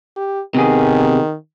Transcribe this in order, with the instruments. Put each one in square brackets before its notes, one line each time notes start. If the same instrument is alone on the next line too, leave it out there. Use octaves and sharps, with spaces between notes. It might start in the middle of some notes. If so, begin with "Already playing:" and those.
[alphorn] G4
[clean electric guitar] C3 B3 G#4 [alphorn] D#3